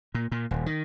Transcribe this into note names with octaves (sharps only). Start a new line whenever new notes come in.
A#2
A#2
D#1
D#3